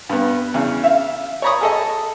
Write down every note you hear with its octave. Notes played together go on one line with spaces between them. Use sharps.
G2 B3
E2 C#3
E5 F5
C#5 D5 A#5 B5 C#6 D#6
G#4 A4 D#5